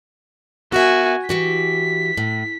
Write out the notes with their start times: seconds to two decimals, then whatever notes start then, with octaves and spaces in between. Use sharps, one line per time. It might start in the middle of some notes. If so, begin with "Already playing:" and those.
0.72 B3 F#4 A#4 E5 G#5
1.29 E3 F#4 G4 B6
2.17 A2